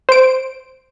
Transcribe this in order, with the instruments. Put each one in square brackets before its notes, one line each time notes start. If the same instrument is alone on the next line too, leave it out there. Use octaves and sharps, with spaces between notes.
[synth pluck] C5 D7